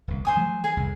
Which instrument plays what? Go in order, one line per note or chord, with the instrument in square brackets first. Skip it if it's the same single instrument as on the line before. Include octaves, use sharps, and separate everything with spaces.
[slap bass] D1 C2
[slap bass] F#2 [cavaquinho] C5 G#5 D#6
[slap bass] F3 F#3 A3
[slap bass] D#3 [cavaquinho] G#4 G#5
[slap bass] F1 C2 F2